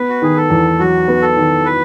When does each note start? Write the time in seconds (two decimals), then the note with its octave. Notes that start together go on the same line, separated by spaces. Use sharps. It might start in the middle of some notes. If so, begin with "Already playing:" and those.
Already playing: B3 B4
0.09 F#4
0.22 D#3 G#4
0.37 A4
0.50 E2
0.79 F#3 F#4
1.08 B3
1.22 A4
1.37 D#3
1.65 B4